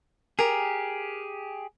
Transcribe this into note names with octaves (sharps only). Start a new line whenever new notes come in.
G4 G#4 A#4